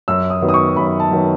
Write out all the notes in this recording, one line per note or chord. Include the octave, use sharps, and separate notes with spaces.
F#2 E6
D#6
D#3 F#3 B3
D#6
C#6
F#2 B5
A5
D#3 F#3 B3